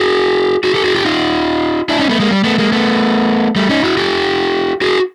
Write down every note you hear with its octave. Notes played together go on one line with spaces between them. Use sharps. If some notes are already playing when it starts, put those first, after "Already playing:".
Already playing: F#4 G#4
F#4 G#4
G4 A4
F#4 G#4
F4 G4
D#4 F4
D4 E4
C#4 D#4
A3 B3
G#3 A#3
G3
A3 B3
G#3 A#3
A3 B3
G3 A3
C#4 D#4
E4 F#4
F4 G4
F#4 G#4